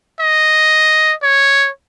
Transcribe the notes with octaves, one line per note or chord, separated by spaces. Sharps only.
D#5
C#5